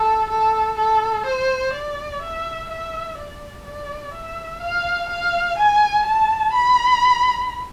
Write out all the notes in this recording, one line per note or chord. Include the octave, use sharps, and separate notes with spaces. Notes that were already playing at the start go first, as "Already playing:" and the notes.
Already playing: A4
A4
A4
C5
D5
E5
E5
D5
D5
E5
F5
F5
G#5
A5
B5